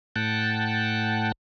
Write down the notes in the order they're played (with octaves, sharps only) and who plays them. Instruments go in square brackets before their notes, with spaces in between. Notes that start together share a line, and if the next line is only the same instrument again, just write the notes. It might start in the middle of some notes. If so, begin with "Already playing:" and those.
[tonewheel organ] A2 F#5 G5 A5